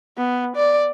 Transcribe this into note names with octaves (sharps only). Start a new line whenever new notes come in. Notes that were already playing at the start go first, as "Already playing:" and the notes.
B3
D5